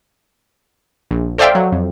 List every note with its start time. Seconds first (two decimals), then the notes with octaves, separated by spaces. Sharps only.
1.11 A#1
1.38 A4 C5 D5 E5 F5 G5
1.55 F#3
1.72 F2